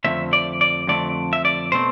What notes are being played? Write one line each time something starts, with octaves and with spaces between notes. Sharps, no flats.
F2 D3 A3 C4 E5
D5
D5
F2 D3 A3 C4 D5
E5
D5
B2 A3 C4 C5